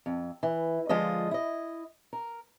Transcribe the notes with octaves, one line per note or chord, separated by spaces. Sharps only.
F2
E3
D3 F3 G#3 F4 D#5
E4 D#5
A#4